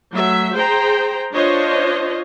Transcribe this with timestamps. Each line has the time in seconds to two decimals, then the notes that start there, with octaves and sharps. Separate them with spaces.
0.13 F#3 A3 E5
0.54 G#4 C5 G5 A#5
1.34 D4 F4 C5 C#5 D#5